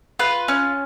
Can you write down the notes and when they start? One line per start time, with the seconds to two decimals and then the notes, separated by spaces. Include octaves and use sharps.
0.19 F4 B4
0.48 C#4